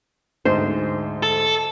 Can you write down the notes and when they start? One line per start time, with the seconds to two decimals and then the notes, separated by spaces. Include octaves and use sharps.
0.45 D2 G#2 C5
1.23 A4